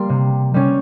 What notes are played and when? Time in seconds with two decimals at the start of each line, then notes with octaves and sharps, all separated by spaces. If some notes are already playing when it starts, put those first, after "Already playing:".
Already playing: G3 A#3 C6
0.09 C3
0.54 G3 C#4